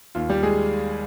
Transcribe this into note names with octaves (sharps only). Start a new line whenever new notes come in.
D#2 F4
G3 G4
G#3 G#4